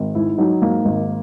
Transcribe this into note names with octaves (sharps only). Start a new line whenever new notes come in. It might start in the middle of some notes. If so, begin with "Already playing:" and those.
Already playing: G#1
G#2 E4
F#3 D#4
G#2 A#3
G#1